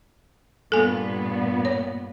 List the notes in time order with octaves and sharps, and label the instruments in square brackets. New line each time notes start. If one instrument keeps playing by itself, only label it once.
[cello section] G2 A#2 B3 [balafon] A4 G#5
[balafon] C#5